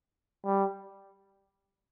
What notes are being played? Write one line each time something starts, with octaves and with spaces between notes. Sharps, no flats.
G3